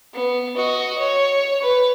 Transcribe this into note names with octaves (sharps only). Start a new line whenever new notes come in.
B3
F#4 D#5
C#5
B4